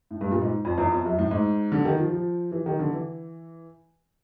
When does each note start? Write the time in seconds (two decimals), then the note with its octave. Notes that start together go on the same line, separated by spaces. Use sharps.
0.11 A2
0.21 G2
0.31 A#2
0.42 G#2
0.65 F2
0.78 E2
0.92 F2
1.05 F#2
1.19 A2
1.31 G#2
1.72 D3
1.85 D#3
1.99 F3
2.12 F3
2.52 E3
2.66 D#3
2.79 D3
2.92 E3